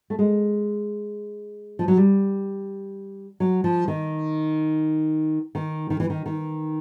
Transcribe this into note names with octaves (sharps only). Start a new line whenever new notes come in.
A3
G#3
F3
F#3
G3
F#3
F3
D#3
D#3
D#3
E3
D#3
D#3